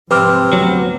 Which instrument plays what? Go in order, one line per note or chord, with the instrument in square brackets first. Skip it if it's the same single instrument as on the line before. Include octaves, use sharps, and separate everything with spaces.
[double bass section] G#2 F3 C4 [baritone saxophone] C3 [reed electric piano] B4 D6 F6
[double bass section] D2 B3 [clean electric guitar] F#3